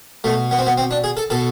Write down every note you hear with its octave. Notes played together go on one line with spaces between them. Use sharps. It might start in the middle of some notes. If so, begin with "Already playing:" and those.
B2 A3
B3
C4
B3
C4
D4
G#4
A4
B2 A4